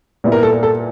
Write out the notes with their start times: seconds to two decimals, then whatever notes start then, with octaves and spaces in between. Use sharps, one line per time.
0.24 A#2 G3 B3 E4
0.32 A#4
0.43 A4
0.63 A4